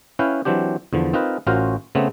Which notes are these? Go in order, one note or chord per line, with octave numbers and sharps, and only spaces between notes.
C#4 E4 B4 F5 G5
E3 F#3 C4 D4 G4
E2 D3 F3
C4 D#4 F4 A#4 B4
A1 C#4 F4 F#4 A#4 C5
C#3 A3 B3 C4